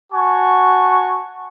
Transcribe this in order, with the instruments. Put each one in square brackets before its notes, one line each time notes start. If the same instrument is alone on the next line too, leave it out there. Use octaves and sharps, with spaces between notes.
[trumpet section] F#4 G#5 A5 C#6